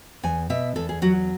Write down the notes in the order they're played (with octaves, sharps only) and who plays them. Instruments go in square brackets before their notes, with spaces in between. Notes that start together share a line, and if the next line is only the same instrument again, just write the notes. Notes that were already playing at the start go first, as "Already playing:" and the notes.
[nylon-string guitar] E2 G#5
B2 E5
E2 A4
G#4
F#3 F#4